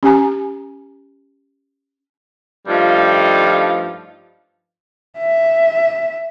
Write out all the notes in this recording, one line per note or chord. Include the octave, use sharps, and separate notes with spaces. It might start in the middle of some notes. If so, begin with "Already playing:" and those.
C#4 G4 G#5 A#5
G2 F3 G3 A3 D#4 F4
E5